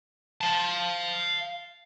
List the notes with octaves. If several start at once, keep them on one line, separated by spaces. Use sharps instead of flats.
F5 A5